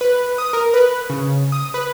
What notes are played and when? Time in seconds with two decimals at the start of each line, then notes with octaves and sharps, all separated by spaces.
0.01 B4
0.38 D#6
0.53 A#4
0.74 B4
1.10 C#3
1.52 D#6
1.74 B4